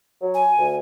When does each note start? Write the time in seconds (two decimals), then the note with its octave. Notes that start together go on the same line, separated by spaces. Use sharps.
0.21 F#3
0.34 G#5
0.58 D2